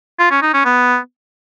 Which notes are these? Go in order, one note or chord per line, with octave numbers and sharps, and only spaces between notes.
F4
C#4
D#4
C#4
B3